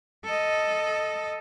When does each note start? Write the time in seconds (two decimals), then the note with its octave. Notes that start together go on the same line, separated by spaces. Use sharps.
0.25 A4 D#5